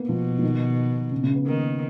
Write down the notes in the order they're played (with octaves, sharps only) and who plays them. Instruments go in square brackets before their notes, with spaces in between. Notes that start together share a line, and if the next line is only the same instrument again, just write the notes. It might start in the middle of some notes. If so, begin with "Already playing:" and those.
Already playing: [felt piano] A#3 B3
[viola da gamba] B2 [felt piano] F3
[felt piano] F3
D#3
C#3
C#3
B3
[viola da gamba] D#3 [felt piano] A#3